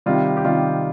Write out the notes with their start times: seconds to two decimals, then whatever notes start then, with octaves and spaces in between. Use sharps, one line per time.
0.06 C3 D#3 G3 F4
0.37 G4
0.45 C3 D#3 G3 F4